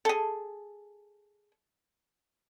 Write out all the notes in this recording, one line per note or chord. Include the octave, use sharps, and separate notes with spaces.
G#4 A4